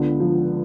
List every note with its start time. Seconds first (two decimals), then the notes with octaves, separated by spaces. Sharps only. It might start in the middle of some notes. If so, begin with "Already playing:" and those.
Already playing: C#2 D3 B3
0.20 F3